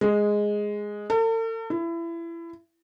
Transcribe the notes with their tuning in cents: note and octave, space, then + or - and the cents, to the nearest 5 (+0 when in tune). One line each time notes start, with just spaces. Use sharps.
G#3 +0
A4 +45
E4 +25